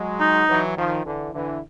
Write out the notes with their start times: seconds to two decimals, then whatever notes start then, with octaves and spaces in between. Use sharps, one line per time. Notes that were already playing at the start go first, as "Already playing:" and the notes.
Already playing: F#3 G#3
0.20 D#4
0.49 E3 F#3
0.77 D#3 F3
1.05 D3 E3
1.34 D3 E3